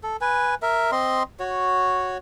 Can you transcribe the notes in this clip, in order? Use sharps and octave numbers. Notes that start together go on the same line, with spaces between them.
A4
B4 G#5
A#4 E5
C4 D#5 C6
F#4 C#5